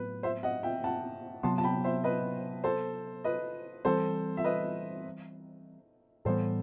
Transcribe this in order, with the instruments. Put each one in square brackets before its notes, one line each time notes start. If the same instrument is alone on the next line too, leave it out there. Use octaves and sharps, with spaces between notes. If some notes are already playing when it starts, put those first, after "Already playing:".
Already playing: [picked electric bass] A2 F#3 B3 [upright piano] B4
[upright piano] C5 E5
D#5 F#5
E5 G5
F#5 A5
[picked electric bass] C3 F#3 B3 [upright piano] A5 C6
[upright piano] A5
G5 B5
C5 E5
B4 D#5
A4 C5
B4 D#5
[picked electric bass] E3 G3 C4 [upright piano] A4 C5
[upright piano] E5
B4 D#5
[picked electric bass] A2 E3 G3 B3 [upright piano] A4 C5